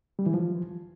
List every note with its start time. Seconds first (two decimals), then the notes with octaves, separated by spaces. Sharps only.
0.19 G3
0.26 E3
0.34 F3